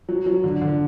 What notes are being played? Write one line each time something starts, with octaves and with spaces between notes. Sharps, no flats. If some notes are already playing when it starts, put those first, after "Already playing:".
F#3
F#3
D3
D3